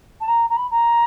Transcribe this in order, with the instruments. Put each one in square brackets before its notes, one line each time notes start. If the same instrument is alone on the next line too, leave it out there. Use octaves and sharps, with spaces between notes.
[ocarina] A5
A#5
A#5
B5
A#5